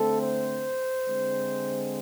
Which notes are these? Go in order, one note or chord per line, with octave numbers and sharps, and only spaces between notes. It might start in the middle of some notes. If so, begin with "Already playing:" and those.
Already playing: D3 A3 C4 A4
C5
D3 G#3 C4